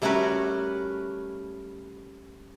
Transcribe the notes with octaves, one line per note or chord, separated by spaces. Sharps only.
G3 A3 C#4 F#4 A#4 B4